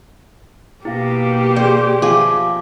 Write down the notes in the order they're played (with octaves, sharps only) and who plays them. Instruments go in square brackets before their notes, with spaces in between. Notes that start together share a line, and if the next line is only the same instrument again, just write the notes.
[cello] B2 A#3 [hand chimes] E4 F5 A#6 [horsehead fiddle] G4
[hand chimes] G#4 D5 [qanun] C5
[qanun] F3 G#4 [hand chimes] E5 F5 D6